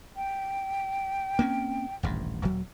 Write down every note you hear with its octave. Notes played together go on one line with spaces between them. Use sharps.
G5
A#3 C4 C#4
D#1 A1 G2
D#1 F#3